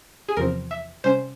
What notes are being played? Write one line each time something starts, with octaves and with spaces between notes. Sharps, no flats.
G#4
E2 C3 F3 C4 A#4
E5
C3 G3 C#4 C5